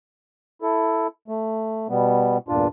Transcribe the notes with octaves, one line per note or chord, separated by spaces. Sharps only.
E4 A4
A3
B2 G3 B3
E2 G2 A#2 D4 F4